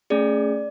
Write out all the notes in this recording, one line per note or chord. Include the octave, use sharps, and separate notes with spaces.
A3 C#4 G#4 D5